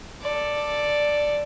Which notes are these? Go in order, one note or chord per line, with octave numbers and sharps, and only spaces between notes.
A4 D5